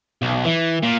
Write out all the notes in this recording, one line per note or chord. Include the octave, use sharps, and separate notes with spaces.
B1
E3
A#2